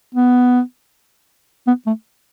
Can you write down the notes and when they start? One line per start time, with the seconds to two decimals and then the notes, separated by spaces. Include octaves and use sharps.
0.15 B3
1.67 B3
1.86 A3